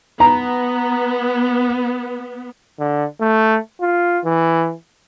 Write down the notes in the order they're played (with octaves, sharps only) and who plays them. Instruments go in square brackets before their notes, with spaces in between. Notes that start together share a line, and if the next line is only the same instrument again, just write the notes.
[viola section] B3 [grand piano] A#5
[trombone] D3
A3
F4
E3